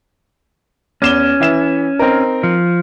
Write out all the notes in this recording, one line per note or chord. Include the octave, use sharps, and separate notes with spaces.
E2 C#4 E7 G7
E3 E5 E7
C4 D#4 A#4
F3